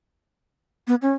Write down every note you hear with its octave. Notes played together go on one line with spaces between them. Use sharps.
B3
C#4